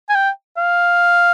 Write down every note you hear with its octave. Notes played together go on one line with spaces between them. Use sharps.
G#5
G5
F5